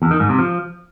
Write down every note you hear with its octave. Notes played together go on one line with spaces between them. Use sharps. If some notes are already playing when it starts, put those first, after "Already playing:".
E2
D#3
G#2
C3
F3